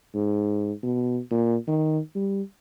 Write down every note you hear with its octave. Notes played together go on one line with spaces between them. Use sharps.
G#2
B2
A#2
D#3
G3